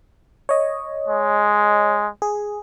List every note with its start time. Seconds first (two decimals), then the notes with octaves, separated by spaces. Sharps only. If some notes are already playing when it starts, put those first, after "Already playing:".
0.49 C#5 D#5
1.08 G#3
2.22 G#4